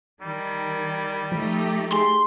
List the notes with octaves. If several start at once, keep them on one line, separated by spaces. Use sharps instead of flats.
D#3 G3
F3 A3 D#4 G4
G#4 C6